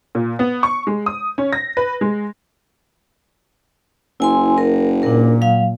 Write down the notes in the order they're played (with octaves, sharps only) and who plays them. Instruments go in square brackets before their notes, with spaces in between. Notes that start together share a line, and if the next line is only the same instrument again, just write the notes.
[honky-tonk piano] A#2
B3
C#6
G#3
D#6
C#4
A#6
B4
G#3
[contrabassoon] F#1 [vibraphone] E4 G#5 C6
[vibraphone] A#4
[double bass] A#2 [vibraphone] D4 A#4
[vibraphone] F#3 F5